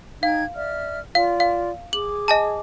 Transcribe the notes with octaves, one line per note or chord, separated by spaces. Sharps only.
D#4 F5 G5 G#6
D5 E5 F6
F4 D5 F5
F5
G#4 D6 F#7
D#5 G#5 A5